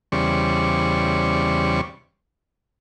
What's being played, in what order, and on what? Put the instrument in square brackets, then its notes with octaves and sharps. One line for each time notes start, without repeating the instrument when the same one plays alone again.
[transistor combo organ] E2 C#3 G3 C5 D5 C#6